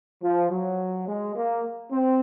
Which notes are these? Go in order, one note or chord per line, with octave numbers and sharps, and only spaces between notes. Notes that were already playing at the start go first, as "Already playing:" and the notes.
F3
F#3
G#3
A#3
C4